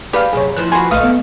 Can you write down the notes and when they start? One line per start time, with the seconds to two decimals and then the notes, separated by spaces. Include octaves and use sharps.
0.13 G4 G#4 B4 D5 F5 B5
0.33 F#2 C3 F#3 G#4 C#5
0.57 E3 F3 C5 F#6
0.72 F#4 B4 G#5 C6
0.91 A#1 A3 B4 D#5 F5 D#6
1.03 B3